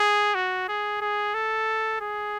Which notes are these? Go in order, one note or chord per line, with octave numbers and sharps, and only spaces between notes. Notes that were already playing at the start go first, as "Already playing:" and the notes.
Already playing: G#4
F#4
G#4
G#4
A4
G#4